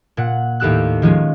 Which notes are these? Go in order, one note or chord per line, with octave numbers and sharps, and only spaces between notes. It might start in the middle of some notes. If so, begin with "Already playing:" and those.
A#2 F#5
D#2 A2 G4 E6 F#6
D#3 F3 G#3 A#3 C#4